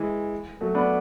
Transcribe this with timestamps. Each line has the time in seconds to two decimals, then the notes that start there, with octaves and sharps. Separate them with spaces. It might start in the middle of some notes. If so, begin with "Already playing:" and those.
Already playing: E3 G#3
0.61 F#3 A3
0.75 B3 D4